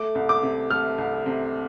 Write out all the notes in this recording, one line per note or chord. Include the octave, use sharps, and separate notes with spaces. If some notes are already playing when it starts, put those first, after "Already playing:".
Already playing: A3 D6
C2
D6
C3
A3 F6
C2
C3